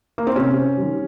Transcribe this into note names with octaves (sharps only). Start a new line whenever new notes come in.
A#3
C4
C3 C#4
D#3 G3